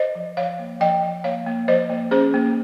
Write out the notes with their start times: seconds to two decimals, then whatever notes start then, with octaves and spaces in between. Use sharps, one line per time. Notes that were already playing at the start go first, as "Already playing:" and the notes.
Already playing: C5 D#5
0.15 F3
0.37 F3 C#5 F5
0.59 A#3
0.81 F3 D#5 G5
1.03 F3
1.24 A#3 C#5 F5
1.47 A#3
1.68 F3 C5 D#5
1.90 A#3
2.11 C#4 G#4 C5
2.34 A#3